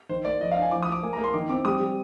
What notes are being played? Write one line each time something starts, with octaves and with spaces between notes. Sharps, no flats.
D#3 C5
A#3 D5
F3 D#5
F5
D4
G#5
F3 D6
D#6
F3
D6
A#3 G#5
A#5
A#3
C6
D#3 D6
C4 D6
G3 D#6
G3